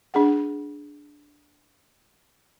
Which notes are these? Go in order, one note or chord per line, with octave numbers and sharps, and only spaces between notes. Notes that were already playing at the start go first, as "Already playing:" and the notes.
D4 G#4 F#5